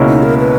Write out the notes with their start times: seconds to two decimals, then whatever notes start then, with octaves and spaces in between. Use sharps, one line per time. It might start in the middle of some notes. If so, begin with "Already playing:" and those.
Already playing: C#2 B2 A#3 C#4 E4
0.09 D#4
0.23 A#4
0.38 B4